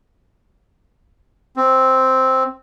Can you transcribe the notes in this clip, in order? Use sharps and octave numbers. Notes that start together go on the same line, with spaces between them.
C4